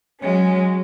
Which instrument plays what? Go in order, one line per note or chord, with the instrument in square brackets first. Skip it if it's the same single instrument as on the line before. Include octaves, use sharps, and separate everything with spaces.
[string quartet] F#3 G#3 C#4